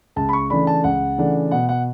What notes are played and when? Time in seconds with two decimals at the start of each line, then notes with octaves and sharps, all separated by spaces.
0.16 C#2 A5
0.29 B5
0.33 C#6
0.50 C#3 E3 A3 D4 B5
0.67 A5
0.84 C#2 F#5
1.18 C#3 E3 A3 D4
1.51 B2 F#5
1.69 F#5